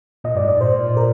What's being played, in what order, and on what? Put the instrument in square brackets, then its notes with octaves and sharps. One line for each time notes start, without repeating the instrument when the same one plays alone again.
[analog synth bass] A#2 [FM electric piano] D#5
[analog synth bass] G2 [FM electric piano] D5
[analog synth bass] G#2
[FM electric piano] D5
[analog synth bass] A#2 [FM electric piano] C5
[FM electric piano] A#4